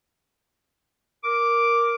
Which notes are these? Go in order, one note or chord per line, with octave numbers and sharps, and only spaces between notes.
A#4 D6